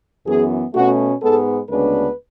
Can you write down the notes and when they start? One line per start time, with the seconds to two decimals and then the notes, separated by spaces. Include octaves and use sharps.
0.27 F#2 E3 B3 G#4
0.74 B2 A3 C#4 F#4
1.21 G#2 G#3 B3 A4
1.68 D2 C#3 G#3 B3 D4 B4